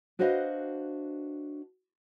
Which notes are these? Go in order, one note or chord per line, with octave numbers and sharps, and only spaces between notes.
D4 F#4 B4 C5 D#5 F5